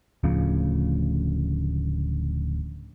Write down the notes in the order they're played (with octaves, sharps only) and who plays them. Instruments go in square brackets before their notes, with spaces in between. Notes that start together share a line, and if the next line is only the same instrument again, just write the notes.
[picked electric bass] D1 D2 C#3 F3